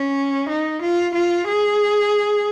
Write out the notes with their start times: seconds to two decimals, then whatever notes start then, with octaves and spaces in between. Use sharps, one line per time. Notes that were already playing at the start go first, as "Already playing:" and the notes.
Already playing: C#4
0.49 D#4
0.82 F4
1.15 F4
1.47 G#4